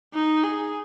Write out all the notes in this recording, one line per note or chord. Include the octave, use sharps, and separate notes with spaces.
D#4
G#4